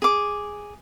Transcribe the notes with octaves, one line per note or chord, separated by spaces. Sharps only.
G#4 D6